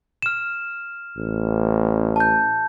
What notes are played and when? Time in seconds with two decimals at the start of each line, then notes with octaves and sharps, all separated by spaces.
0.22 F6 E7
1.17 A1
2.16 A5 G6